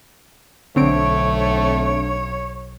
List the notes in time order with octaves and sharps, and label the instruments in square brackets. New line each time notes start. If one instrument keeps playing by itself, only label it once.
[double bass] B1 [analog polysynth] D3 C4 D7 [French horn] A3 [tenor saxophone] C#5